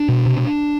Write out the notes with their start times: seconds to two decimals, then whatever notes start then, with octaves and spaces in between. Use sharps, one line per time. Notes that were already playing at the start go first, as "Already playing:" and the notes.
Already playing: D4
0.09 B2
0.26 C3